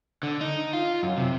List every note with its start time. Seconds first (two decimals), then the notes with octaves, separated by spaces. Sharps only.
0.23 D3
0.41 D#4
0.73 F4
1.03 F#2
1.18 C3